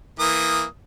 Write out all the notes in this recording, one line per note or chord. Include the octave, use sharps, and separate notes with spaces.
E3 A#3 D#6